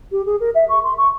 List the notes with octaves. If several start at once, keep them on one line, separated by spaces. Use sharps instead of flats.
G4
G#4
A#4
E5
C#6
C6
C#6